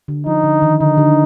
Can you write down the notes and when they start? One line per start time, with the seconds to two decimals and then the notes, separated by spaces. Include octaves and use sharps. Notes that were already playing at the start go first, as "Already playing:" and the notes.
0.08 D3
0.26 F3 D#4
0.44 D3
0.62 D#3
0.80 D3 D#4
0.98 D3